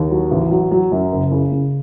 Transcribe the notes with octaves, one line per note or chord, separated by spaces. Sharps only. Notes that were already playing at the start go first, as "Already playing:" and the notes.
Already playing: D#2
F#3
A1
F#3
F#3
F#2
F#1
C#3
C#3